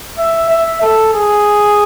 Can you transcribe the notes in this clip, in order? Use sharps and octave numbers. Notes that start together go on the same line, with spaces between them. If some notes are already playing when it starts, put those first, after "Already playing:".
E5
E5
A4
G#4